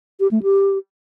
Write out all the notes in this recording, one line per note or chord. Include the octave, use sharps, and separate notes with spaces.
G4
A3
G4